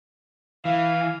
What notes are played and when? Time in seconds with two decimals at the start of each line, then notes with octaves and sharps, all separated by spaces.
0.65 E3 F5